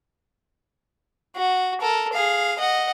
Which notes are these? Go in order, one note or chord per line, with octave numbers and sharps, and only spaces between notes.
F#4
A4 A#4
G#4 F5
D#5 F#5